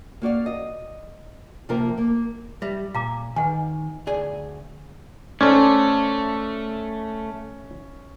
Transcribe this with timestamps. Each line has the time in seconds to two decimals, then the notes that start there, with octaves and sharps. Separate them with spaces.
0.22 A#3 F#4 D5 F5
0.46 D#5
1.69 C3 F3 A#3 F4 A#4
1.98 A#3
2.62 G3 E5
2.94 A#2 F5 A#5 D6
3.36 D#3 B4 F#5 G#5
4.07 D2 G#4 D5 G#5
5.41 A3 C#4 A4 C5 D5